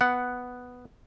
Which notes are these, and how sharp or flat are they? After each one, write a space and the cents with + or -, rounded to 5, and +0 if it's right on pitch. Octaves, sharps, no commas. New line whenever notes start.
B3 +0 F#5 +5